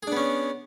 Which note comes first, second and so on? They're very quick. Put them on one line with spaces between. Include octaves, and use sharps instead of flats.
G#4 D4 B3 C#4